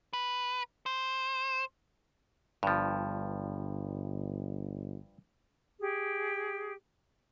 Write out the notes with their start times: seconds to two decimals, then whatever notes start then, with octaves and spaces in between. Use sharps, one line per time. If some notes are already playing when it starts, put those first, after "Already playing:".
0.13 B4
0.86 C5
2.63 G1 G2 F3
5.80 G4 G#4